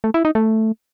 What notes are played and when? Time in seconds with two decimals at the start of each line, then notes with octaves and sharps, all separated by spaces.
0.04 A3
0.14 E4
0.25 D#4
0.35 A3